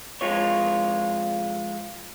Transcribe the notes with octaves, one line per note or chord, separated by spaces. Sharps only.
F2 A#2 G#3 F4 C#5